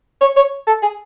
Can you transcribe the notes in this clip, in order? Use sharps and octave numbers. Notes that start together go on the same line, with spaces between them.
C#5
C#5
A4
G#4